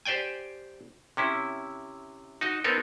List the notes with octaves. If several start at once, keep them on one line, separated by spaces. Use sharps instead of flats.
G4 C5 D5 G5 G#5
C3 C#4 E4
D#4 F#4 D#5
B3 C4 D#4 A4 A#4